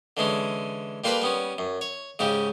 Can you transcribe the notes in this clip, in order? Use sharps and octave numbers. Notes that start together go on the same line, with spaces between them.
D3 E3 G#3 C#4
G3 A#3 F4 A4 B4 D5
G3 B3 C#4
F#2
C#5
G#2 C#3 C#4 G4